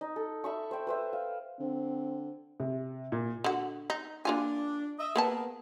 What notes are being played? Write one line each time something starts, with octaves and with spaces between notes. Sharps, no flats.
D#4
A4
E5 B5 C#6
C5 G5
B4 C5 E5
F5
D3 C4
C3
A#2
D3 F#4
D#4
A#3 D4 F4 G#5
D#5 E5
A#3 B3 G#4 A#4 B4 A5